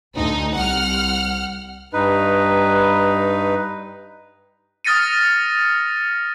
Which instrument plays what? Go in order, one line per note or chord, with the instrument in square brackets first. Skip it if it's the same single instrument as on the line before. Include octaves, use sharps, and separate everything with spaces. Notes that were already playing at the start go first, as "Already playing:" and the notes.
[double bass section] D2 [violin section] D#4
[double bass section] C2 [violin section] F#5 F6
[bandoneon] G2 D#4 B4
[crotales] D#6 F6 A6 A#6 C#7 D#7